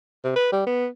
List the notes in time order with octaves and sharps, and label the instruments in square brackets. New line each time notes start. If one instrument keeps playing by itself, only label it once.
[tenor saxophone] C3
B4
G3
B3